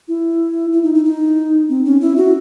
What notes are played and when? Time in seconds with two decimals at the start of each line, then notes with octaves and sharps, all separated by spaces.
0.08 E4
0.72 E4
0.83 D#4
0.94 D#4
1.05 D#4
1.69 C4
1.85 C#4
2.01 E4
2.17 F#4